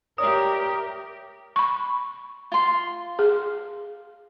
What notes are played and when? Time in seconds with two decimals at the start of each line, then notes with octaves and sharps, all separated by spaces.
0.18 G4 A#4 C#5 D5 E5 D#6
1.56 B5 C#6
2.52 F4 C6
3.19 G#4